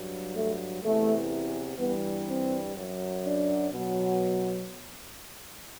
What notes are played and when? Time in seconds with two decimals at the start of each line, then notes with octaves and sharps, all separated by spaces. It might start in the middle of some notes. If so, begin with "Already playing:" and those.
Already playing: G2 F#3
0.34 A3
0.82 E2 C3 E3 A3
1.78 G2 E3 G3 B3
2.26 C4
2.75 F#2 F#3
3.23 D4
3.72 B2 F#3